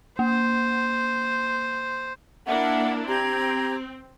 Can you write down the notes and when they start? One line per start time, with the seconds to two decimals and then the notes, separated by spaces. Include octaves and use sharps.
0.19 A#3 C5
2.46 A#3 D4 E4 E5 F#5
3.08 C4 G4 A#5 G#6